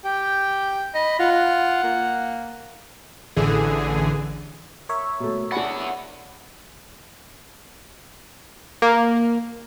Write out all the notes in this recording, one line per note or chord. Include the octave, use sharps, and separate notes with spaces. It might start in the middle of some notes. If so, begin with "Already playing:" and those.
G4 G5
D#5 B5
F4 F#5
F#5
A#3
A1 D3 E3 G#4
A#4 C#5 E5
B2 A3
D4 E4 F#5 G#5 B5
A#3